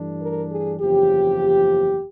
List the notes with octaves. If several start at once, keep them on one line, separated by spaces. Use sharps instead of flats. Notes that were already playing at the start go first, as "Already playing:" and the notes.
Already playing: G2 E3 A3 D4
A#4
G#4
F#1 E2 C#3 F3 G4